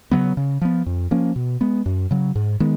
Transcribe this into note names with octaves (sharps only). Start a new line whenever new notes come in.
C#3 F#3 B3
C#3
F3 B3
F2
F3 A#3 C#4
B2
G#3 B3
F#2
C#3 F#3
G#2
D#3 G#3 B3